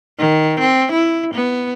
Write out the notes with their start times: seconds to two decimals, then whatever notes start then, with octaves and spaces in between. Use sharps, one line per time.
0.19 D#3
0.60 C4
0.92 E4
1.34 B3